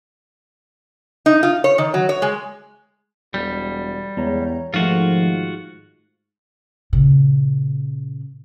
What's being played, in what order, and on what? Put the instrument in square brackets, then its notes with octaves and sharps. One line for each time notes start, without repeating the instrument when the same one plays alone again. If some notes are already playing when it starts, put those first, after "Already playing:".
[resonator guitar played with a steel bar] D#4
F4
C#5
D#3
F#3
C#5
G#3
[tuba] E1 [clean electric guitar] G3
[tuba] E2 [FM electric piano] G#3 A#5 [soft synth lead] C#5
[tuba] G#2 [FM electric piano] D#3 A3 [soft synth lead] F3 [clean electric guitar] F4 F#4
[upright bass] A#2 C#3